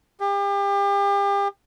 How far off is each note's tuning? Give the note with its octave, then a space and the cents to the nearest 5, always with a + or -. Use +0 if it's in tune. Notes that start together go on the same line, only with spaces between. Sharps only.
G4 +35